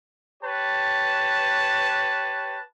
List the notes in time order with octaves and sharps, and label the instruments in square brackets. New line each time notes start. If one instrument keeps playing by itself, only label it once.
[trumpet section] G4 B4 C#5 A5